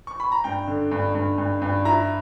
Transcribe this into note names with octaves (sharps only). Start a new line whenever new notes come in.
C#6
B5
A#5
G2 G5
D3
G2
G2
G2
G2
E4 A#5